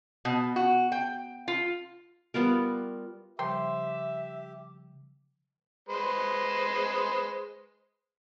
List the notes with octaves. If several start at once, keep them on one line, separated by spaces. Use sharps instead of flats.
B2
F#4
G5
F4
G3 B3 F4 A#4
C#3 F3 G3 G4 C5 E5 G5 C6
G#3 B4 C5